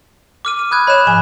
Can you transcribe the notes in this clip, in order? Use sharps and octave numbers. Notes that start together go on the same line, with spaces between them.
D6 F6 D#7
D#7
B5 D#6 F#6 G#6
C#5 D#5 B5 F#6 E7
G#2 F3 G#5